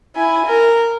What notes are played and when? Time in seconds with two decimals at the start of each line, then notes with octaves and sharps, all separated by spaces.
0.16 E4 G#5
0.45 A#4